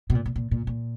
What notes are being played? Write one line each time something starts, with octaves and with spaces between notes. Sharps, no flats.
B2
A#2
A#2
A#2
A#2
A#2